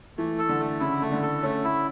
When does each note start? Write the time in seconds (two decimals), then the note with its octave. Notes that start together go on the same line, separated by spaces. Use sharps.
0.17 E3 A3
0.39 A4
0.49 D3
0.60 A3
0.80 C#3 E4
1.01 A3
1.12 D3
1.22 A4
1.43 A3 C#4
1.64 E4